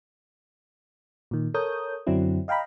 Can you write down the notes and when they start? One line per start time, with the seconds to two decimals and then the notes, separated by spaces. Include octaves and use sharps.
1.31 A#2 D#3
1.54 A4 A#4 C#5 D#6 G6
2.07 F#2 D3 F#3 C4 D4 E4
2.48 D#5 F5 G5 A#5 B5